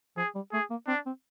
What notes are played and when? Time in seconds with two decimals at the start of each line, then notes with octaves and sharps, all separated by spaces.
0.17 F3 G#4
0.35 G3
0.52 A3 G#4
0.70 A#3
0.87 C4 D4
1.06 C4